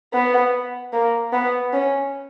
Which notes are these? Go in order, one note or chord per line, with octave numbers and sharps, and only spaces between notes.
B3
A#3
B3
C#4